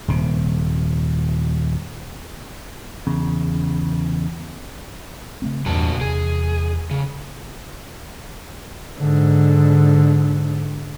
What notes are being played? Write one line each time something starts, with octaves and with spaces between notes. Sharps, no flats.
D#1 C3
E2 C#3
C#3 A3 C4
E2 G2 A#2 G3 F#4 A5
E2 C3 G#4
C#3
G#2 D3